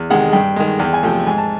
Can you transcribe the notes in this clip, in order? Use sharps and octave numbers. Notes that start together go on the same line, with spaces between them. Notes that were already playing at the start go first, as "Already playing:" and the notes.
Already playing: E2
C3 D#3 G#3 F#5
G2 G5
D#3 G#3
E2 G5
G#5
C3 F3 A3 G5
G#2 G#5
A5